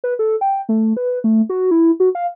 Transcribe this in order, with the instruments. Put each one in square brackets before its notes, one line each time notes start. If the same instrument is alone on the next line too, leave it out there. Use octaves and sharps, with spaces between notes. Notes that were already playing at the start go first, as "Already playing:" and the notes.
[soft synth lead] B4
A4
G5
A3
B4
A3
F#4
E4
F#4
F5